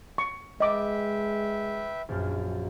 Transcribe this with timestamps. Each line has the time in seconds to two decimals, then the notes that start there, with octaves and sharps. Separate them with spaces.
0.18 C#6
0.60 G#3 B4 D#5 E5 G5 D6
2.09 A#1 F#2